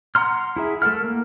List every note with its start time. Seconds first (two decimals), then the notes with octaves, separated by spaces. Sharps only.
0.15 F#5 A#5 C6 F6
0.56 E4 G#4 E5
0.82 A3 A4 A#4 F#5 F6
1.04 A#3